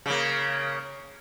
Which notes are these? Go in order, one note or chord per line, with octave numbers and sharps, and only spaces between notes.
C#3 A#3